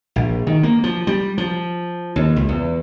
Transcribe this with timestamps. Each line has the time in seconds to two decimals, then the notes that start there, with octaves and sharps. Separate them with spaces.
0.16 A#1
0.47 D#3
0.63 A#3
0.83 F3
1.07 G3
1.38 F3
2.16 D#2
2.36 C#2
2.49 E2